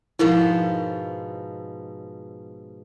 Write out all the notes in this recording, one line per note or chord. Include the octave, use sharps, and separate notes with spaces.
G#2 B2 F3 E4 A#4